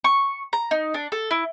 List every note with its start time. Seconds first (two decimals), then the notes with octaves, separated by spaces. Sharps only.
0.04 C#6
0.53 A#5
0.71 D#4
0.94 D4
1.12 A4
1.31 E4